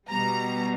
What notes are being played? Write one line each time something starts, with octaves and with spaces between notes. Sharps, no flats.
B2 G3 A#5